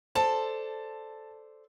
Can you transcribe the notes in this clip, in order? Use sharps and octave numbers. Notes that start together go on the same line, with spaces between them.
A4 C5 D5 A5